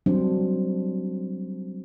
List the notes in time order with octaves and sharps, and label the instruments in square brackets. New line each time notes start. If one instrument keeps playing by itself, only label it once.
[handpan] F#3 G3 C4 D4 C5